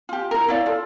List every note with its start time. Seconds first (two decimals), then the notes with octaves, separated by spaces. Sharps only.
0.09 F4 G4
0.31 E4 A#4
0.48 E4 C#5 D5 F5
0.66 F4 A4